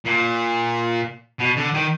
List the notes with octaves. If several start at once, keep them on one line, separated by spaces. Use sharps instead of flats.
A#2
B2
D3
D#3